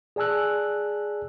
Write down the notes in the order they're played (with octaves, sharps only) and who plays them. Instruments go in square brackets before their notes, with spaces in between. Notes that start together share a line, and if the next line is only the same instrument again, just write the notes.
[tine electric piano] G#4 D5 G#5 A5 E6 F#6